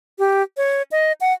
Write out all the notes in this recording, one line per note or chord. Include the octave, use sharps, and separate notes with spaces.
G4
C#5
D#5
F#5